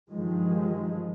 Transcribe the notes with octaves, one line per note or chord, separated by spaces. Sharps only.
G2 D#3 F3 G#3